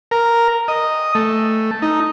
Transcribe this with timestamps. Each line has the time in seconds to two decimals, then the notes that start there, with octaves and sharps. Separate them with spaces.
0.11 A#4
0.68 D#5
1.15 A3
1.82 D#4